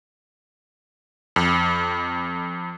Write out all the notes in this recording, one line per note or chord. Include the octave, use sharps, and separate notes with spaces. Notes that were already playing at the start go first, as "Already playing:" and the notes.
F2